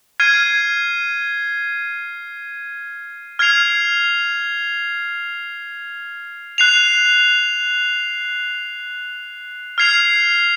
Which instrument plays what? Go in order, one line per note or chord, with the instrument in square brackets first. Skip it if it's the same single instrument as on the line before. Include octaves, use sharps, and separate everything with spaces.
[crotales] F6 G#6 C7 D#7
F6 G#6 C7 F7
F#6 C7 F7
F6 G#6 C7 F7